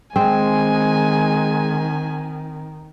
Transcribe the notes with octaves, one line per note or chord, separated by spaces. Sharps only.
D#3 G#3 C4 G#5